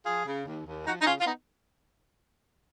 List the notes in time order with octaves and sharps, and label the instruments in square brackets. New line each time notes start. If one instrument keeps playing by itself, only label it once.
[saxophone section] F3 F4 G#4
C#3
D#2
D#2
F3 D#4 F#4
D#4
C#3 C#4 F4
F4
B3 D#4